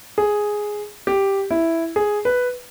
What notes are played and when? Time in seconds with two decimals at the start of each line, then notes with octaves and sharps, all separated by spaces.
0.18 G#4
1.07 G4
1.51 E4
1.96 G#4
2.25 B4